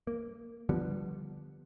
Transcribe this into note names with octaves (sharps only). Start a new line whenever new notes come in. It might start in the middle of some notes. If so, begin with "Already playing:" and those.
A#3
D3 F3 G3 B3